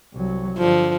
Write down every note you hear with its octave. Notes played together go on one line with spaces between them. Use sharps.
C2 F#3
G2 D3 F3